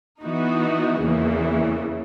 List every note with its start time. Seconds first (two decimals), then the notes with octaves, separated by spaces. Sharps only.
0.22 E3 B3 D#4 F#4
1.02 E2 C#3 E3 A#3